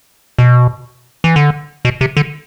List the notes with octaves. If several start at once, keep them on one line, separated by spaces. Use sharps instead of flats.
B2
E3
D3
B2
C3
D3